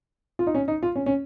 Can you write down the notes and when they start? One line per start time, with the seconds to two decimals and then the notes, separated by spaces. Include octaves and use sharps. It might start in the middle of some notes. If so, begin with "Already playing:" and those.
0.39 F4
0.47 D#4
0.55 C#4
0.68 D#4
0.83 F4
0.96 C#4
1.06 C#4